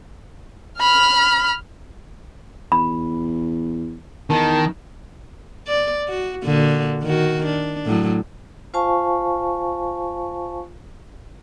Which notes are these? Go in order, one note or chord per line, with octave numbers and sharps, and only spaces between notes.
B5 F6
E2 B5
E2 D#3 A5
D5
F#4
A#2 D3 F#4
D#3 F#4
D4
A2 F#3
F4 C5 F5 G#5 A5 C#6